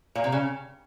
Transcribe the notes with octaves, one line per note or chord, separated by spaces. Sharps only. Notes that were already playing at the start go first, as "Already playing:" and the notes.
A#2
C3
C#3